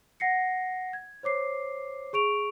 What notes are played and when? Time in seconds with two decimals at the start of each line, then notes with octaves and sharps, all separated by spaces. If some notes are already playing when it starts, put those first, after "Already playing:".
0.20 F#5 A#6 C7 C#7
0.93 G#6
1.23 C5 C#5 D6 C7
2.13 G#4 C#6 D7 F7